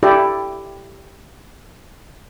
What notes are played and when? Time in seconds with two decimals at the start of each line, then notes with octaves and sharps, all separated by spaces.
0.03 E4 G4 A4 D5